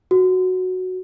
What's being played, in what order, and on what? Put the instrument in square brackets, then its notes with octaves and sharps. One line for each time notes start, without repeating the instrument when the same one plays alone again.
[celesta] F#4